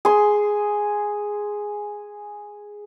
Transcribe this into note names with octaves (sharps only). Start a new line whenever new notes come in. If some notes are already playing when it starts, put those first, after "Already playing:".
G#4 C6